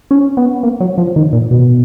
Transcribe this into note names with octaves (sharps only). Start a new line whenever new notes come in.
C#4
B3
A#3
F#3
F3
D#3
A#2
B2